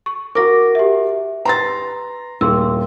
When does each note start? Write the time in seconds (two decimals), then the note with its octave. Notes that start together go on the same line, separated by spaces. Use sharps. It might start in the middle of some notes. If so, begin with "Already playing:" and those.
0.06 C#6
0.35 F#4 A#4 D6 A#6
0.75 G4 E5
1.45 B4 A#5 C6 A6
2.41 D#1 G#4 C6 E6